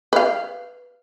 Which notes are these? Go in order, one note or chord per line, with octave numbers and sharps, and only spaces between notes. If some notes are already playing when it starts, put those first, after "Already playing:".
B4 F5